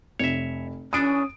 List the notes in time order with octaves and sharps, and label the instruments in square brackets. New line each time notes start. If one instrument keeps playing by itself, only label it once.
[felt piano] F1 [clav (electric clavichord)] C#5 E5
[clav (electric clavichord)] E3 D4 A4 [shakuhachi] C#4 [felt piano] D#6 D7